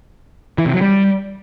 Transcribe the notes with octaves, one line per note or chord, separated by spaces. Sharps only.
E3
C3
F#3
G3